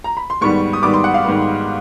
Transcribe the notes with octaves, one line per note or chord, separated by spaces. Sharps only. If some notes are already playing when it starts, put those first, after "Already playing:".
A#5
B5
C6
G#2 D#3 G3 B3 C#6
D#6
G#2 D#3 G3 B3 D6
C6
F#5
F5
G#2 D#3 G3 B3